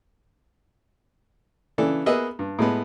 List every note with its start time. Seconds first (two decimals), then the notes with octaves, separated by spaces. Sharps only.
1.78 C#3 E3 D4 A4
2.06 A#3 B3 G#4 B4 D#5 E5
2.39 G2
2.59 A2 G#3 B3